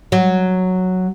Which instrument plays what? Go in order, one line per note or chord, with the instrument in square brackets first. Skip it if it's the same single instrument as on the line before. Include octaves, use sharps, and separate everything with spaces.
[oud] F#3